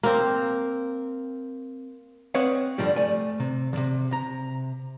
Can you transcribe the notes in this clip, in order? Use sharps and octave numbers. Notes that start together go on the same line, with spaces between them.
A#3 C4
C4 B4 C#5 D#5 F5 F#5
G2 D3 D#3 F3 G3
A3 D5 G#5
C3
E2 C3
C3 A#5